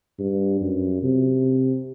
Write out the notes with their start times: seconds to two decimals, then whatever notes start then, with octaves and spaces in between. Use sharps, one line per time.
0.19 G2
0.61 F#2
1.03 C3